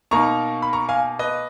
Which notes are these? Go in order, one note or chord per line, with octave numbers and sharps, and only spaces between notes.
B2 A#3 D#4 A#5 C#6
B5
A#5 C#6
F5 G#5
B4 D#5